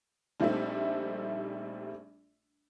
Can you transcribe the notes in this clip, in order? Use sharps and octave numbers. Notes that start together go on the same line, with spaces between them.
A#1 G3 A3 C4 D#4 E5